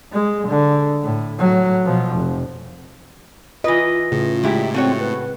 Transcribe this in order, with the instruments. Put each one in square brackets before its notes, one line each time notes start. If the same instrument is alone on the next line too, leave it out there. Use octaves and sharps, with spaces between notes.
[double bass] G#3
D3
A2
A2 F#3
B2 F3
F1
[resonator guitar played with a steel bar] E3 B4 [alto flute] F4 [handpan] D#5
[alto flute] F4
[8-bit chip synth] A2 [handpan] C#3
[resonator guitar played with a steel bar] A#2 E4 G4 [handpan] G#3
[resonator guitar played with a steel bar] A3 F#4 C#5 [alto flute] C4
[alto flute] B4